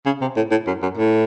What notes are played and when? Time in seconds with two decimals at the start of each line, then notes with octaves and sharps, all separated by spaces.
0.06 C#3
0.21 C3
0.36 A2
0.51 A2
0.67 F#2
0.82 F#2
0.98 A2